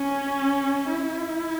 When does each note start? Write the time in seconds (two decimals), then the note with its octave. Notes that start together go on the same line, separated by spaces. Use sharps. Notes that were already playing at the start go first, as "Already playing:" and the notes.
Already playing: C#4
0.89 E4